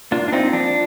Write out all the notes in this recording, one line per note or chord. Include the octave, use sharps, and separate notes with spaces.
A#3 D4 F4
D4
C4 D#4 F4
F3 D4